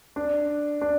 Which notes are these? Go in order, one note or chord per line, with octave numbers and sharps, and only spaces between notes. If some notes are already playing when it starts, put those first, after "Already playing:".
D4
D4